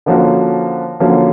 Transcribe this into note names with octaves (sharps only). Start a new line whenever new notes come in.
D3 F3 A#3 C#4 F#4
D3 F3 A#3 C#4 F#4